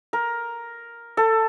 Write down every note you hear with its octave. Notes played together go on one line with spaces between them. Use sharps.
A#4
A4